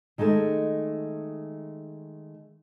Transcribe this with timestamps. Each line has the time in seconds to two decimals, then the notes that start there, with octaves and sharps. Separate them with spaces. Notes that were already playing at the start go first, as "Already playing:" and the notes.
0.18 D#3 G#3 A3 A5